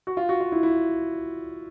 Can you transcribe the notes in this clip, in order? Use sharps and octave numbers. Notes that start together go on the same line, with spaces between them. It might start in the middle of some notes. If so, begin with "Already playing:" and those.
F#4
F4
F#4
F4
E4
E4